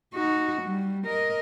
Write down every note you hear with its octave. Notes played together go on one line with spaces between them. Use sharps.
D#4 F#4
G3
A#4 D#5